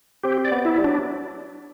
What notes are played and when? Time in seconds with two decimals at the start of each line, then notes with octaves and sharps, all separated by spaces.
0.23 C4 G4
0.45 D5
0.52 B3
0.65 E4
0.78 G3
0.84 F#3 D4